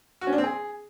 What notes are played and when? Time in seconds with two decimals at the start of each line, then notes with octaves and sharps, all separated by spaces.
0.21 F#4
0.27 C#4
0.33 D4
0.38 C4
0.44 G#4